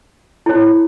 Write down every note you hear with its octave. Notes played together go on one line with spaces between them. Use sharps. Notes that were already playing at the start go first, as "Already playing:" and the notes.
E4 A4 C#5